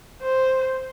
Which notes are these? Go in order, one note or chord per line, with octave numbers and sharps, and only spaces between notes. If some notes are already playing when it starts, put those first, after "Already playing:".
C5